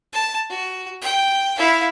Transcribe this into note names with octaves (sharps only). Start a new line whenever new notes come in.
A5
F#4
G5
E4 F5